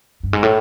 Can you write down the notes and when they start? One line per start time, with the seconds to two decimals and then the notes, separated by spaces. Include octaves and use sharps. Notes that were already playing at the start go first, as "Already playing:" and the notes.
0.23 G2
0.33 G#2
0.43 A2